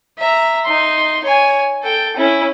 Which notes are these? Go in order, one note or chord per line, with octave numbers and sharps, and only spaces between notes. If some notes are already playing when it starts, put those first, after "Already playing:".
E5 A#5
D#4 C6
C#5 G#5
A4 G5
C#4 E4